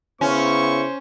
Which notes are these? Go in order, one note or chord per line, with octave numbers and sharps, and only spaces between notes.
C#3 B3 C#4 E4 C5 C#6